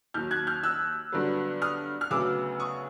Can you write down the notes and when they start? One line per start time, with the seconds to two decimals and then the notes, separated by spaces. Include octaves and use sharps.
0.14 D#2 D#3 F#3 F6 G6
0.31 F#6 G#6
0.47 F6 G6
0.63 E6 F#6
1.12 G2 D3 F#3 B3
1.62 D#6 F6
2.01 F6
2.11 D2 C#3 F#3 B3 D6 E6
2.60 C#6 D#6